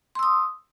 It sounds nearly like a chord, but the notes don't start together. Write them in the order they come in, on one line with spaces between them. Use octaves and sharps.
C6 E6 D#6